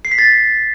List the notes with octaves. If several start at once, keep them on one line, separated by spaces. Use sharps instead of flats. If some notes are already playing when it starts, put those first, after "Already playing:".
C7
B6
A6